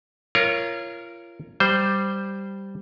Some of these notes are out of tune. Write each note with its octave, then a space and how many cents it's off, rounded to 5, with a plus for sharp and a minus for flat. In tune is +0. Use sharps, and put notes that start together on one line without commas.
F4 -30 A#4 +0 C#5 +0
G3 +0 C5 -5